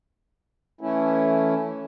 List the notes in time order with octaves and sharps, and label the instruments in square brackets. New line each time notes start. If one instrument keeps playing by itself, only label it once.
[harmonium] E3 A3 C#4 E4